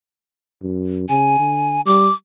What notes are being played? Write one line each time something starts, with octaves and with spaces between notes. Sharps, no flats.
F#2
C#3 G#5
D3
G3 D6